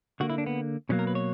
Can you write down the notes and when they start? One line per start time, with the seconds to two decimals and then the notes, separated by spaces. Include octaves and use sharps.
0.20 D3 A#3 F#4
0.30 E4
0.38 D4
0.47 B3
0.89 B2 F#3 A#3 C#4
0.99 A#4
1.07 B4
1.15 C#5